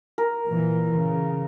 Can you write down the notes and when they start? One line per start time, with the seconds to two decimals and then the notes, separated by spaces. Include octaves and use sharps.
0.18 A#4
0.50 A#2 E3
0.94 C#3